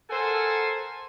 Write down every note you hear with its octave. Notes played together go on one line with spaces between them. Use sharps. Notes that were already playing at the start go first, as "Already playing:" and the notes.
A4 A#4 C5 F#5 G#5 A5